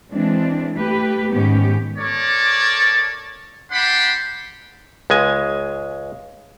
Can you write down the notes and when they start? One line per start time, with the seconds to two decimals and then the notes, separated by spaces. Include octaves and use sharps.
0.11 E3 G#3 C4 D4
0.76 A3 G4 B4
1.32 G#2 D#3 B3 C#4 G4
1.98 A4 A#4 C#5 D5
3.72 D4 G4 F#5 B5 C6
5.10 C#2 G#3 G#5